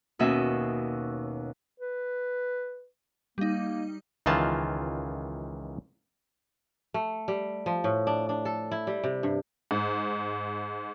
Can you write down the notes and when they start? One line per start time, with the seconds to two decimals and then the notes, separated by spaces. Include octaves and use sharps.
0.19 D#2 B2 C#4 E5
1.80 B4
3.38 G3 A#3 D#4
4.26 C#2 D#3 E3 F4 A5
6.94 A3
7.28 G3
7.66 F3
7.84 A2
8.07 D4
8.29 D4
8.45 A4
8.71 E4
8.87 G3
9.04 C3
9.23 G2
9.71 G#2